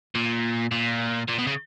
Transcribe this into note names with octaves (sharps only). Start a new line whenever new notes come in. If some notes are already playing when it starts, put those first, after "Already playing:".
A#2
A#2
A#2
B2
C#3